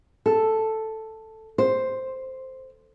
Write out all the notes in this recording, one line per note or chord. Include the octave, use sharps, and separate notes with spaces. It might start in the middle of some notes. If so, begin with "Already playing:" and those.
A4
C5